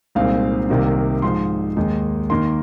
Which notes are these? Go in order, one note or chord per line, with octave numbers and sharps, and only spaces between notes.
C2 A#2 G#3 C4 D#4 F5
C2 C3 D#3 A#3 D#4
G#2 F3 G#3 D#4 C6
D#2 D#3 G#3 D#4
D#2 D#3 A#3 C6